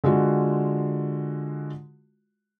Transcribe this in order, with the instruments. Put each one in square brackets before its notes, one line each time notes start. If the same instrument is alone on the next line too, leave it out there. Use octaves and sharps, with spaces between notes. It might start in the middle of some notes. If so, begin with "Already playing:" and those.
[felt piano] D3 G#3 F4 F#4